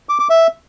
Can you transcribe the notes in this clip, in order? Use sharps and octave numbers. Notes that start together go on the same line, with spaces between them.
D6
D6
E5